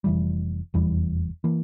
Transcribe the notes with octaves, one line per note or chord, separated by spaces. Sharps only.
F1 E2 E3 G3
F1 E2 E3 G3
E3 A#3